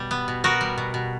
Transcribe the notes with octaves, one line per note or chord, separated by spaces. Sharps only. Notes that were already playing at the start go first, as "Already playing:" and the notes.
Already playing: B2 G3
B3
B2
B3 F#4 A#4
G3
B2
B2